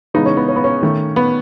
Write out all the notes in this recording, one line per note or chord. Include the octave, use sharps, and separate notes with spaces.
C#3 E3 G#3 B3 D#4
C#4
B3
C#4
B3
C#4
D#3 A3
B3